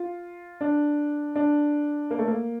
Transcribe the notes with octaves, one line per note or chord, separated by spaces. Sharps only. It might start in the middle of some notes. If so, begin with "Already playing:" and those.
Already playing: F4
D4
D4
A#3
A3
A#3